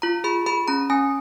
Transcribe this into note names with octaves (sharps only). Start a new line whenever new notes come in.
F4 A#5
G#4 B5
G#4 B5
C#4 A#5
C#4 G#5